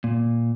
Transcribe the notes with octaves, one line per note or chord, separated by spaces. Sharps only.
A#2